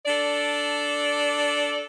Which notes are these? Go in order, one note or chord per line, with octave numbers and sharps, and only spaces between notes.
D4 A4 D5